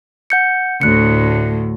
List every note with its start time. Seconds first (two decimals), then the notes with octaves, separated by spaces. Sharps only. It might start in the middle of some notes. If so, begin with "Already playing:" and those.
0.30 F#5 G6 C#7
0.81 D2 A2 F#6 C#7